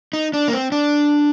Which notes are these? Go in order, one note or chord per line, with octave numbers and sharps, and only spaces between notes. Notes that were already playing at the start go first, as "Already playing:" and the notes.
D#4
D4
A#3
C4
D4